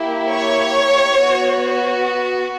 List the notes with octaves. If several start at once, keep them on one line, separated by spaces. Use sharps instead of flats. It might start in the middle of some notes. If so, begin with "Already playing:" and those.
Already playing: A#3 E4 G4
C#5
B3 F#4